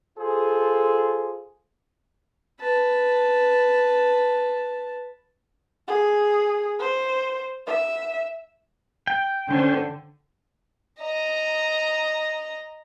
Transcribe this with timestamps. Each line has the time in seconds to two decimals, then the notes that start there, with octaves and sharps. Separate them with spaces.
0.18 F4 G#4 A4 C5
2.60 B4 A5
5.88 G#4
6.80 C5
7.67 E5
9.07 G5
9.51 D3 C#4 C5
11.00 D#5 A#5